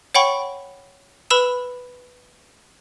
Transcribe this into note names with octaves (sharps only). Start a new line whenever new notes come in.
C#5 F#5 G5 B5 C#6
B4 B5 E6 E7